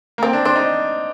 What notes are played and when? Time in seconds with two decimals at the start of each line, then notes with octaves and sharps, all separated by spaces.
0.18 A#3
0.23 C4 A#4
0.33 D4
0.45 D4 C5
0.55 D#4